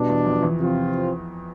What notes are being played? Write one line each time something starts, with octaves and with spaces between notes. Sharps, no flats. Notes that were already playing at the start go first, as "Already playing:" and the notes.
Already playing: B2 G3 D4
E2 E3
F2 F3
E2 E3
C3 F3 C4 F4